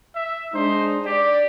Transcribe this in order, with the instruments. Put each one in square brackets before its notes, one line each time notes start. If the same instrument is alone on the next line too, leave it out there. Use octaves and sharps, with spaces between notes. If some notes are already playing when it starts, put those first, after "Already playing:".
[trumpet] E5
[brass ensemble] G#3 D4 D#4 [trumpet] C5
[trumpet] G4 [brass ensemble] D5